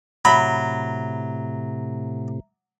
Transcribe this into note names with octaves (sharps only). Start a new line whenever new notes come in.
A2 C3 F#3 E5 A#5 B5 G7